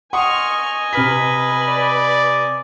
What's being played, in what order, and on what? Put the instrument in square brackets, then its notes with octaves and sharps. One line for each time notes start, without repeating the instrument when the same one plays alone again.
[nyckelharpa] D#5 G#5 [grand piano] F#5 C6 D#6 [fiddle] C#6 F6
[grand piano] C3 F6 B6 [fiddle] B4
[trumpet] D5